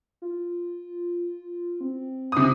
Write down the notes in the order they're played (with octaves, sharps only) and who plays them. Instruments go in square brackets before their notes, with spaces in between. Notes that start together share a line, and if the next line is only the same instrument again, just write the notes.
[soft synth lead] F4
C4
[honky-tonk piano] C3 D#6